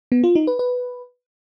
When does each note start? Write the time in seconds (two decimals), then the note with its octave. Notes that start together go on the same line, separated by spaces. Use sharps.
0.12 B3
0.24 F4
0.35 D#4
0.47 B4
0.59 B4